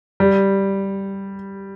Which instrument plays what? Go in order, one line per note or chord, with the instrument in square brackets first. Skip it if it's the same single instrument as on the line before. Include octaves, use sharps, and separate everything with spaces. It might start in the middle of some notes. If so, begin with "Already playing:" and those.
[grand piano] G3